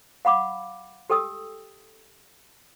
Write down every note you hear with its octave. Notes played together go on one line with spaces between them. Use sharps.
F5 F#5 B5 D6
G4 A4 G5 D#6 E6